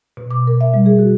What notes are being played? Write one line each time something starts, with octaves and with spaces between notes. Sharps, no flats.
B2
D6
A#4
E5
G3
G#4
F#4